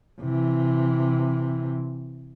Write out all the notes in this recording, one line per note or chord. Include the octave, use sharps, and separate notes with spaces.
C3 E3